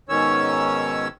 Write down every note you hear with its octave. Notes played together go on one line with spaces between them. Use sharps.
G#2 B2 D#3 C#4 C#5 E6